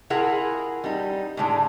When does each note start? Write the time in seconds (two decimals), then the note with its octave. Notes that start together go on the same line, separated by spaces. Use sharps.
0.10 E4 F4 G#4 A#4 F#5
0.84 G3 D#4
1.37 A2 D3 G#3 D5